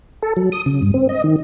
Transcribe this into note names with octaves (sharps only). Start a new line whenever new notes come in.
A4
F#3
D#6
C#3
G2
C4
D#5
D#3